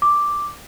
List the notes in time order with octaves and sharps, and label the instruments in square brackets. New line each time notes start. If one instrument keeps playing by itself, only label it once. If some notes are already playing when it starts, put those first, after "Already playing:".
[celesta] D6